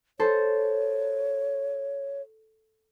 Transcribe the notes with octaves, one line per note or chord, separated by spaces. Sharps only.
A4 C5 C#5